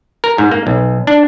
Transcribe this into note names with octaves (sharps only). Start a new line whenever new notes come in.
A#4
G#2
A#3
B1
D4